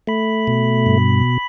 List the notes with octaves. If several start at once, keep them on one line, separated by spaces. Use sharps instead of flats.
A3 B5
B2
G2